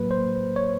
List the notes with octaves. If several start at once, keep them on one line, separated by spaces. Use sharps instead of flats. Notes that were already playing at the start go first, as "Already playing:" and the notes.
Already playing: A2 F#3 A#3 B4
C5
C#5